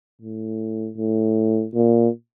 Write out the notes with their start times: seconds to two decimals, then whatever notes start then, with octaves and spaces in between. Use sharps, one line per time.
0.22 A2
0.97 A2
1.74 A#2